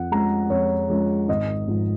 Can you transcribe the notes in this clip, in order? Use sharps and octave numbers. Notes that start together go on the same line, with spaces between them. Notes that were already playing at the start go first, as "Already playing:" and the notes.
Already playing: F2 F#5
F3 G#3 C#4 A#5
F2 C#5
F3 G#3 C#4
G#1 D#5
G#2 F3